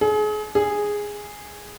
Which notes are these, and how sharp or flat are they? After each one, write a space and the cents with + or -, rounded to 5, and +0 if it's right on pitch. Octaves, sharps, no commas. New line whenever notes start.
G#4 +35
G#4 -5